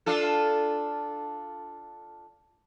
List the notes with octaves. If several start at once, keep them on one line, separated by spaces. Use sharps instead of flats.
D4 F4 A4